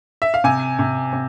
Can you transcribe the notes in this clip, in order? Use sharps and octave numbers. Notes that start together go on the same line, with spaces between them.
E5
F5
C3 G#5
C3
C3